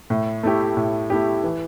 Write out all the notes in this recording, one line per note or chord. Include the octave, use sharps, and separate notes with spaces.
A2
A3 E4 G4
A2
A3 E4 G4
E3